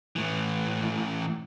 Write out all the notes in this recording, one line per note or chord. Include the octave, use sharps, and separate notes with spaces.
A2 E3